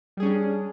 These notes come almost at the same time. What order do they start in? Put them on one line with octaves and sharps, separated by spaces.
G3 G#4 C#4 D4